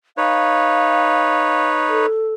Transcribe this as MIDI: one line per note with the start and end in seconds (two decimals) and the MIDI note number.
0.17 2.06 63
0.17 2.06 71
0.17 2.06 73
0.17 1.69 77
1.88 2.34 69